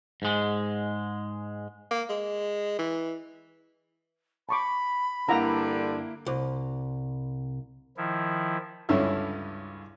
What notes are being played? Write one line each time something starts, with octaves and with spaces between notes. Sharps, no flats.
G#2 G#3
A#3
G#3
E3
A5 B5 C#6 D6
G2 D3 A#3 E4 F5 F#5 A#5
C2
D#3 F3 E4
C#2 G2 D3 C#4 E4 E5